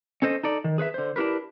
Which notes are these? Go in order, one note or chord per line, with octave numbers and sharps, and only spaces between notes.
C#4 A4 C5 D#5
D#4 A4 D5
D#3
G#4 B4 C5 E5
D3 C5
D4 E4 G4 A#4 B4